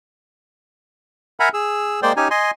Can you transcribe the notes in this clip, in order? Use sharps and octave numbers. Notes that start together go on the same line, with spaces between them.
A#4 E5 F#5 G#5 A#5 B5
G#4 E6
G#3 A#3 C5 D5 G5 C6
C#4 D#4 G4 G#5
D#5 G#5 C6